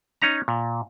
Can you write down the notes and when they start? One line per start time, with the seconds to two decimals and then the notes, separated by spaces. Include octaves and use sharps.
0.22 C#4 D#4 A#5
0.48 A#2